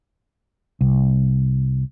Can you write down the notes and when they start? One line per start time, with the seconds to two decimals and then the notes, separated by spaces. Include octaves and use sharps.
0.81 C2